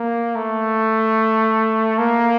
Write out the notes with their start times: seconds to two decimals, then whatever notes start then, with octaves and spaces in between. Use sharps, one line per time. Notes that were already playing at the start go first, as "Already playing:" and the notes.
Already playing: A#3
0.35 A3
1.98 A#3